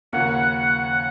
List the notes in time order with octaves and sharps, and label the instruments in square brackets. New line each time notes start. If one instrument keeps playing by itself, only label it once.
[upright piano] D#2 C#3 F3 A#3 C#4 [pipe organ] F#5